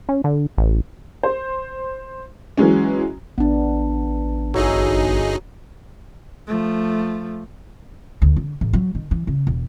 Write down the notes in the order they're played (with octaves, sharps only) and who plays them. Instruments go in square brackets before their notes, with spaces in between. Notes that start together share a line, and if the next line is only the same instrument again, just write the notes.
[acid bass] C#4
D3
A1
[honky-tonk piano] C5
E3 F#3 G#3 C#4
[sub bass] A1 [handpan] B3 D4
[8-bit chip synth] G1 D#4 G#4 [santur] F#3 E4 [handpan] A4
[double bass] F3 A3
[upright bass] D2
D3
A1
F#3
D#3
E3
C#3
E1